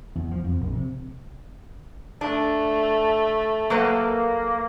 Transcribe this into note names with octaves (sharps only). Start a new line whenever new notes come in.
E2
F3
F2
A#1
C3
A3 D4
F#3 A#3 A4 B4